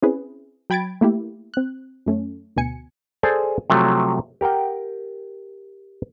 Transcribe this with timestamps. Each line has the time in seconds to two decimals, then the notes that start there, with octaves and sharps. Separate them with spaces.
0.02 C4 C#4 E4 G#4 B4
0.70 F#3 G5 B5 G#6 A6 D7
1.01 A3 A#3 E4 G4
1.54 C4 F#6
2.06 F#2 A3 C#4
2.56 D2 B2 G#5 C#7
3.23 G#4 A4 C5 D5 G#5 A5
3.70 C3 F3 F#3 A3
4.41 G4 A#4 F#5 G5